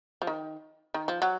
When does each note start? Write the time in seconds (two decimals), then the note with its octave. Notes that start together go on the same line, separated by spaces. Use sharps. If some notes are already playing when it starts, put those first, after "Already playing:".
0.22 F3
0.27 D#3
0.94 D#3
1.08 F3
1.22 F#3